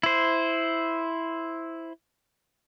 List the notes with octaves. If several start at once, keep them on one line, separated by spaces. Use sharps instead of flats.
E4 C5